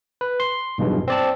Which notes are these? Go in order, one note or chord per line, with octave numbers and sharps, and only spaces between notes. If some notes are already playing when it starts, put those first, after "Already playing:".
B4
C6
B1 E2 G2 B2
C4 D5 A5